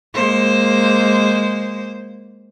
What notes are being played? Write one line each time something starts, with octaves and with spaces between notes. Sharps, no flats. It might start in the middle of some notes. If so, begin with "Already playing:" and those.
G#3 A#3 C5